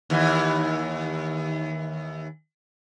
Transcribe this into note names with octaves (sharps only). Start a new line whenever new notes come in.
D#2 E3